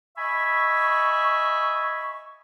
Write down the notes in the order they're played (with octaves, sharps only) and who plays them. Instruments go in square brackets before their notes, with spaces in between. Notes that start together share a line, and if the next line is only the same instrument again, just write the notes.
[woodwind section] D#5 E5 G#5 B5 C#6